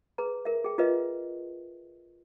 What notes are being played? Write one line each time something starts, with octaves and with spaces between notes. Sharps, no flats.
G#4 B4 A#5
A#4 E5
G#4 G5
F4 A#4 B4 D#5 E5